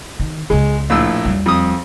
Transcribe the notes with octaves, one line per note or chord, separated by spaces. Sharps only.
D#3
C#2 C#3 G#3
A#1 A2 E6
E2 G3
F2 D#6